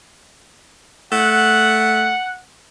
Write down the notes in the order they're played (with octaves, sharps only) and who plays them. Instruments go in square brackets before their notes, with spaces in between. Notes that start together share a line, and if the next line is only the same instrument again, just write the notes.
[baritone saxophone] A3 [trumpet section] F#5